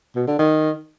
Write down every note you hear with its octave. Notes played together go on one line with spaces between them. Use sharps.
B2
D3
D#3